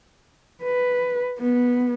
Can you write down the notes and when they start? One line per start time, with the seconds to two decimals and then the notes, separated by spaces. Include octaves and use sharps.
0.63 B4
1.40 B3